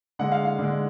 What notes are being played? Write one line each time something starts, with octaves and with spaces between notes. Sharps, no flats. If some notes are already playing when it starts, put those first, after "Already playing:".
D3 G#3 F#5
F5
F5
D3 G#3